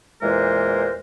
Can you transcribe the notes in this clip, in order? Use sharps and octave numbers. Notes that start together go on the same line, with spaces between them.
E2 A#2 E3 G#3 A#4 C5